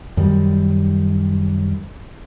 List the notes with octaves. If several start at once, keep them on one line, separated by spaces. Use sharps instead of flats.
F#2 D#3 G3